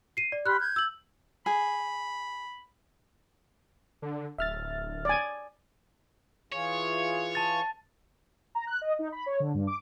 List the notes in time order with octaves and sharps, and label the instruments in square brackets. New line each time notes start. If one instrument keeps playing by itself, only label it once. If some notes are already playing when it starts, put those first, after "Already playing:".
[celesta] C7 D#7
D5
[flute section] G4 B5 C6 [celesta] F6 F#6
[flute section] G6 G#6
[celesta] E6 F#7
[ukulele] G#4 [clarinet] B5
[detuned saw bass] D3
[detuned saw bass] D1 [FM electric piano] E5 F6 A6
[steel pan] D5 G#5
[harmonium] E3 F4 G#4 [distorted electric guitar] C#5
[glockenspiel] A5 A6
[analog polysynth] A#5
F#6
D#5
D#4
B5
C#5
D3
G2
D6